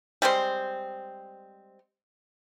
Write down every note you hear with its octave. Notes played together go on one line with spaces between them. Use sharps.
G3 G#3 C4 C5